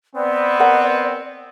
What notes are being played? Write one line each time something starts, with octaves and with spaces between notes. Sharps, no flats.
B3 C4 D5
A#4 F#5